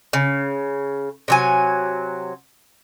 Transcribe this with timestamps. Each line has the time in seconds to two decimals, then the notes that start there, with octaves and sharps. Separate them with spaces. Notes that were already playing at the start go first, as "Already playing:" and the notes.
0.13 C#3
1.28 C3 F#3 G#5